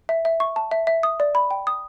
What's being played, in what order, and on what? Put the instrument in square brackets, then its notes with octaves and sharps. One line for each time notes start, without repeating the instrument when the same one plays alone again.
[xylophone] E5
E5
C#6
A5
E5
E5
D#6
D5
B5
G5
D#6